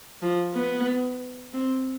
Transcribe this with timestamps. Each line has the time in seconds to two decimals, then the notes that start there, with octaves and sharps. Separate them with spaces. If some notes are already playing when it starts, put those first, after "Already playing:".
0.22 F3
0.54 B3
1.53 C4